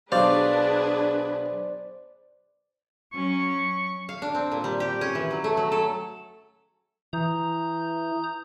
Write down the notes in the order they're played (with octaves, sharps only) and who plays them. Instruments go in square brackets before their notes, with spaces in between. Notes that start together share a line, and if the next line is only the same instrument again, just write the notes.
[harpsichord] B1 F5 [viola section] D4 G#4 B4 [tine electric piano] C5 D5
[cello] F#3 C#4 [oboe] C#6
[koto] F5
D4
C4
A#2
G3
G4
C#4
E3
F#3
A3
F#3
A4
[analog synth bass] E3 [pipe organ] A#5 D#6 G6